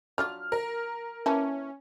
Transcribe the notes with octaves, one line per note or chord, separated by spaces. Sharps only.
F#3 D4 F4 F6
A#4
E3 A#3 C#4 A5